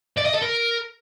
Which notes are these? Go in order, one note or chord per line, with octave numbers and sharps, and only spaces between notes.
D5
D#5
A4
A#4